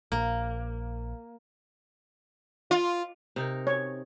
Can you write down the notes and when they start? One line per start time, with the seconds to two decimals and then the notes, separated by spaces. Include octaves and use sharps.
0.12 A#1 A#3
2.71 F4
3.36 C3 D#4 A#4
3.67 C#5